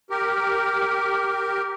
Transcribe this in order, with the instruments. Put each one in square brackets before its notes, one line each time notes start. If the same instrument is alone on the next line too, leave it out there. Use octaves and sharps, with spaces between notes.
[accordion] G4 A#4